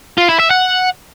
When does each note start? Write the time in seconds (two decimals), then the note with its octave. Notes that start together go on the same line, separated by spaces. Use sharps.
0.18 F4
0.29 E4
0.40 E5
0.51 F#5